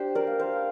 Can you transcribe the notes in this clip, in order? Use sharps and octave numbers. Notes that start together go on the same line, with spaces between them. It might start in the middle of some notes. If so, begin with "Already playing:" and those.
Already playing: D4 G4 C5
A#4 D5
A#3
C5 F5